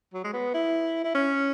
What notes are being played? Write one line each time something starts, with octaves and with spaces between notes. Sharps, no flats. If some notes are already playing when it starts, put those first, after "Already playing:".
F#3
G#3
B3
E4
E4
C#4